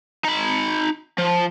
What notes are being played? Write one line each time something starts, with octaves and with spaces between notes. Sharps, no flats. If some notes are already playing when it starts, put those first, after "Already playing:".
D#4 B5
F3